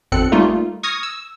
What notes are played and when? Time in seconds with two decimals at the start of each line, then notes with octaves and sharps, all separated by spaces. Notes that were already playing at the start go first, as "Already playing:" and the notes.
0.12 G#1 E2 C4 A4 F#6 C#7
0.32 G3 A3 A#3 D#4 F4
0.83 C#6 D#6 F6 G#6 A#6
1.03 E6